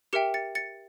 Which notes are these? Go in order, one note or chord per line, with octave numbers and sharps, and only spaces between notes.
G4 A#4 E5 G5 C#7 E7
A6 C#7
A6 C#7